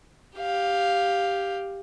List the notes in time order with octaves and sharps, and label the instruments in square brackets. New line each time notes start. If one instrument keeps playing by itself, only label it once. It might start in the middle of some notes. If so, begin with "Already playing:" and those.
[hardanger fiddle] G4 F5